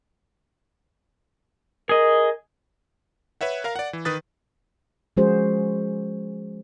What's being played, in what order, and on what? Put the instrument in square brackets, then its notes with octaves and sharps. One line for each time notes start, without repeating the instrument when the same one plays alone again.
[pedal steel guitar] G#4 D#5 [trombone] A#4
[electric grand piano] B4 C#5 E5 F#5
A#4 F5 A#5
D5 F#5
E3
D#3 B4 D#6 A6
[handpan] F3 G#3 C#4 F#4 G#4 C5